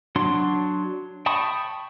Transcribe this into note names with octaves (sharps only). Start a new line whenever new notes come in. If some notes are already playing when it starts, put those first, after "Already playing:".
F#3 D4 F#4 C6
G5 A5 B5 C#6 D#6